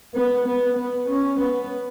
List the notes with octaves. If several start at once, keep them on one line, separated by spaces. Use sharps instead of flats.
B3
B3
B3
C#4
B3